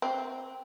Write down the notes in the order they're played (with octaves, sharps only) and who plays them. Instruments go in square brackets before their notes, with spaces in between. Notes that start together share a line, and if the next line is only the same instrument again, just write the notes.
[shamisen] C4